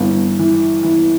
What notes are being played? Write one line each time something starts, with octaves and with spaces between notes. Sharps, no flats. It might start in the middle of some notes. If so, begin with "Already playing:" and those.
Already playing: G1 E3
E3
E3